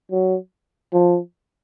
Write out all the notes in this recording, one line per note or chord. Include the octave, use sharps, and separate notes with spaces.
F#3
F3